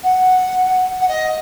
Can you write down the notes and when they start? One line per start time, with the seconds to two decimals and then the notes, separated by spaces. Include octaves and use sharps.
0.03 F#5
1.01 F#5
1.07 D#5